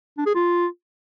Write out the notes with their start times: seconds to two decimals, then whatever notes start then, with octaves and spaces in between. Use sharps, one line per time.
0.18 D4
0.26 G#4
0.35 F4